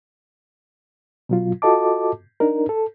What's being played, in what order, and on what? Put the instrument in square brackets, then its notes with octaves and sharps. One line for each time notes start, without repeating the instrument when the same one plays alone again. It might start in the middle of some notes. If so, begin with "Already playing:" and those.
[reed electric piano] B2 F#3 F4
F4 F#4 A4 D#5 A5 D6
D4 D#4 A#4
A4